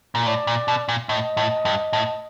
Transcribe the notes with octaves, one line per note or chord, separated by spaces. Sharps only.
A#2
A2 D5
A#2
B2
A#2
A2 D#5
A2
G2
A2